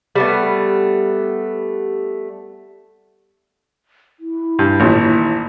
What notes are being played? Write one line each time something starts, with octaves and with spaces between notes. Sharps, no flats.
G3 A3 B3
E4
G2
A1 D#2 A#2